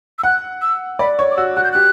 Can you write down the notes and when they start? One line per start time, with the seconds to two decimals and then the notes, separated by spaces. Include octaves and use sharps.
0.19 E6
0.23 F#5 F#6
0.62 E6
0.99 D5 B5
1.18 C#5 C#6
1.31 D6
1.37 F#4 E6
1.56 F#4 F#6
1.64 G6
1.72 G4 F#6